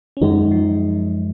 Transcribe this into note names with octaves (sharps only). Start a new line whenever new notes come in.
C#4
F#2 D#3 G#3 D#4
F3